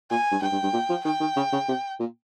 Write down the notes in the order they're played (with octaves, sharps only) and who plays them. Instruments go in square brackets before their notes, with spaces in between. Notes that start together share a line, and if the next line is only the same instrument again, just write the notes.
[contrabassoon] A#2 [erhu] G#5
[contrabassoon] G2
[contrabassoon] G2 [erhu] G5
[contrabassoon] G2
G2
A#2
F3
[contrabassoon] D#3 [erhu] G5
[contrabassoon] D#3
C#3
C#3
C3
A#2